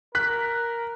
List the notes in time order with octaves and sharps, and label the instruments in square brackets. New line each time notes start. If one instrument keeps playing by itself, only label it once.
[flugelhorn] A#4 [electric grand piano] F#6 B6